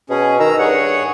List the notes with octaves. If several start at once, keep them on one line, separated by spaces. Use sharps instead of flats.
B2 C#4 G#4
D#3 A#5 E6
G2 G#4 C#5 F#5